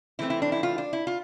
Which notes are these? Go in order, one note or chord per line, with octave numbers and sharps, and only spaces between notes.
E3 A3 C4 E4
E4
D4
E4
F4
D4
E4
F4